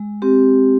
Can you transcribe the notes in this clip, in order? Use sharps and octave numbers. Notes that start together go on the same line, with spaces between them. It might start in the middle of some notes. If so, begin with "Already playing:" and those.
Already playing: G#3
C4 G4